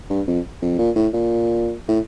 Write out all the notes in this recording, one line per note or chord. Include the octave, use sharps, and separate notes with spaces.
G2
F2
F2
A#2
A2
A#2
A2